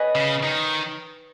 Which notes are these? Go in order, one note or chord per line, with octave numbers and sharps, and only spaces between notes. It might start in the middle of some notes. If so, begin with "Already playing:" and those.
Already playing: B4 C#5 D#5 G#5
C#3
D#3